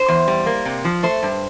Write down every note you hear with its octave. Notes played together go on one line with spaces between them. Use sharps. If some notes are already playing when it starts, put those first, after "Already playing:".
Already playing: C5
E2
G3
A#3
C3
F3
A3 C5
G2